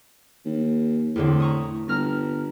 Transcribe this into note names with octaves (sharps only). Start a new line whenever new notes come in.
D#2
E2 A2 D3 C4
A#5 C#6 D#6
G1 A#5 F6 A#6